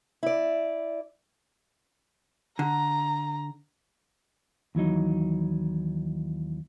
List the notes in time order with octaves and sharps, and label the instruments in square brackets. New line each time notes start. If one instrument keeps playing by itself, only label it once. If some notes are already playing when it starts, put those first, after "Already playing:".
[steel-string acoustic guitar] E4 D5
[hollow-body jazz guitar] D3 [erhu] A#5
[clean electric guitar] D#2 E3 F#3 D#4